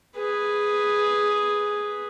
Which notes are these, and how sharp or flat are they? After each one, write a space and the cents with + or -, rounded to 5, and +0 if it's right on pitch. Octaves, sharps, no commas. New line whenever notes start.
G#4 +0 B4 +0